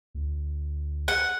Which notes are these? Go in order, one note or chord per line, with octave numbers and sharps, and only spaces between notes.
D2
F#5